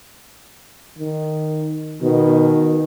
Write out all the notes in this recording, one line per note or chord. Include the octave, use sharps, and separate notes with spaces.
D#3
B2 D#3